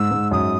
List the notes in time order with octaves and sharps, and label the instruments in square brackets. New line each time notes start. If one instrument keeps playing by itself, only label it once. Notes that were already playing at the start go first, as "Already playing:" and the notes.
Already playing: [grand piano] G#2 [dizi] E6
[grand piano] G#2
[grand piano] F#2 [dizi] D#6